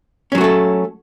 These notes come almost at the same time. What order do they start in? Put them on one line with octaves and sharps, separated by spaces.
C#4 F#3 F#4 A3 A4